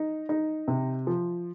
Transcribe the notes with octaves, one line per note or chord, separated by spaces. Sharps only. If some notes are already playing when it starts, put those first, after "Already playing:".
Already playing: D#4
D#4
C3
F3